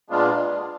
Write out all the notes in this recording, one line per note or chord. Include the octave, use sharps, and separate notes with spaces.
A#2 G#3 B3 D4 F4